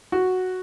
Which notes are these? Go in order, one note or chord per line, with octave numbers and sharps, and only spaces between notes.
F#4